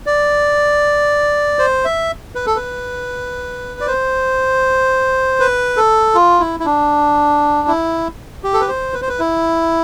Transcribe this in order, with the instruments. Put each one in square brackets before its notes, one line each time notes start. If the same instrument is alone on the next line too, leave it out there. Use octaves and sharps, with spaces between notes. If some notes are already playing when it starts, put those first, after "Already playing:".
[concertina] D5
C5
E5
B4
A4
B4
D5
C5
B4
A4
F4
E4
E4
D4
E4
G4
A4
B4
C5
B4
C5
B4
E4